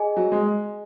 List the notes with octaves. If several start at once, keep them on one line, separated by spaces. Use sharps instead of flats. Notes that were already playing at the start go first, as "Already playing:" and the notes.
Already playing: G#4 D#5 G#5
F#3
G#3